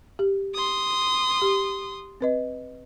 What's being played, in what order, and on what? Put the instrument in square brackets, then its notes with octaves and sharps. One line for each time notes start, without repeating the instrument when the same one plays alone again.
[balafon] G4
[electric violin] C6 D#6
[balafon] G4
C4 B4 D#5